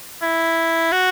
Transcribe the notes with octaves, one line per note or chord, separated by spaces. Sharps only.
E4
F#4